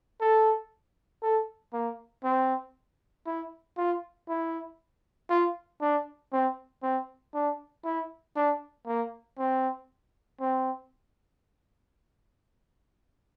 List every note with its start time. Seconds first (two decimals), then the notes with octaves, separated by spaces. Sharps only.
0.21 A4
1.22 A4
1.73 A#3
2.24 C4
3.26 E4
3.78 F4
4.29 E4
5.30 F4
5.81 D4
6.33 C4
6.83 C4
7.34 D4
7.85 E4
8.36 D4
8.87 A#3
9.38 C4
10.40 C4